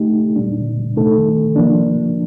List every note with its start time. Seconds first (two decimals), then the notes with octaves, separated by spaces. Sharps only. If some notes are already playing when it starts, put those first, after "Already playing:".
Already playing: A3 D#4 G4
0.36 A#2 G3 D4
0.95 C3 D#3 A3 D#4 A4
1.56 F3 A#3 D4